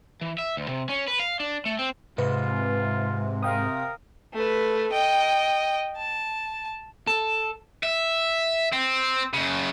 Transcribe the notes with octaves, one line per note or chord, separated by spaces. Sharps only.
E3
E5
D2
C3
C#4
B4
F5
D4
A3
C4
G#2 C3 F4 B4
A#4 F5 G5 D#6
A3 B4
D#5 G5
A5
A4
E5
C4
F#2 C#3